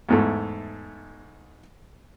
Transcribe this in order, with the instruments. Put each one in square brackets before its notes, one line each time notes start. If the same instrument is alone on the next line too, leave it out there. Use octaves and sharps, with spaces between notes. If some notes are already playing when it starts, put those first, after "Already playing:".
[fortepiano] E2 G#2 A3